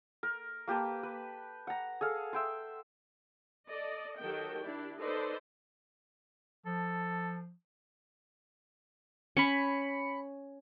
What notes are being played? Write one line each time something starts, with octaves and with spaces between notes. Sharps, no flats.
A#4
A#3 G4 B4 A5
B4
F#5 A#5
G#4 A4 F5
E5 G5 C6
A4 D5 D#5
D#3 F#3 G4 A4 D#5 G5
D4 E4 G4 D5
D#4 A4 B4 C5 D5 D#5
F3 A4
C#4 B5 C#7